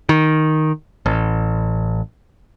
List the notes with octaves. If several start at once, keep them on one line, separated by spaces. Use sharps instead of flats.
D#3
A1